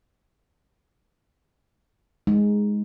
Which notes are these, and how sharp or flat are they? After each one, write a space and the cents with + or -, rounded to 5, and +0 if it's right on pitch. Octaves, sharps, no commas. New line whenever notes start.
G#3 +0 D#4 +5